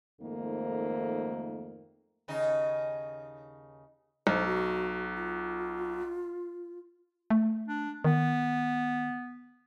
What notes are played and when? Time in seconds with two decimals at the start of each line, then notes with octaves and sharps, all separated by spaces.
0.21 F2 G#2 D#3 A3 A#3
2.28 D#2 C#3 D#4
4.27 B1 C5
4.45 F#4
5.17 F4
7.30 A3
7.68 D4
8.04 D#3 B3